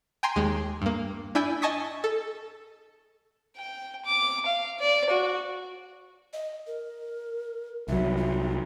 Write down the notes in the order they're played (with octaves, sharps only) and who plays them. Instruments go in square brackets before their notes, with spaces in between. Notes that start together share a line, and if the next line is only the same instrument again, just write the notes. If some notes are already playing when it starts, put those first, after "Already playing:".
[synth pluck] G5 G#5 A#5 C6
D#2 G#3
G2 A#3
D4 E4 G#5 E6 G6
D#5 G#5 A5 C#6 D#6 B6
A4
[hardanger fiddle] G5
D6
F5
D5
F#4
[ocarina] D#5
A#4
[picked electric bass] C2 F#3 [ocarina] E5
[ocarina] F4